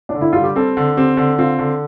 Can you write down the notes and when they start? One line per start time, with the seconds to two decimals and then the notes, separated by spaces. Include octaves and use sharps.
0.09 D4
0.15 D3
0.21 E4
0.33 G3 F4
0.44 G4
0.56 C4 A4
0.77 D3
0.97 C4 G4
1.17 D3
1.39 C4 F4
1.59 D3